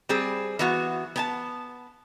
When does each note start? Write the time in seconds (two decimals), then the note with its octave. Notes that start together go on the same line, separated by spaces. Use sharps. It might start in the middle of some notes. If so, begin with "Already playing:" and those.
0.09 G3 C4 G#4
0.59 E3 B3 F#4
1.16 B3 G#5 A5